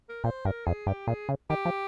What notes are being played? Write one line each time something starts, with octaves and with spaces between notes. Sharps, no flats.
A#4
A#2 C5
G2 A#4
F2 G#4
G2 G4
A#2 G#4
C#3
D#3 G4
F3